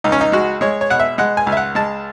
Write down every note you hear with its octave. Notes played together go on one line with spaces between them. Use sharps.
C#2 D#4
C#4
D#4
G#3 F#4
G#3 C#5
C#5
B2 F#5
E5
G#3 F#5
G#5
C#2
E5
F#5
G#3 A5